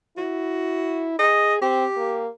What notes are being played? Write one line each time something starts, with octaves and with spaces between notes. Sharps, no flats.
E4 F#4
G#4 D#5
C4 G4
A#3